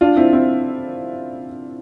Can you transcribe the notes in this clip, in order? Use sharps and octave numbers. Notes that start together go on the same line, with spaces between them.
D4 F4
C4 E4
C4 E4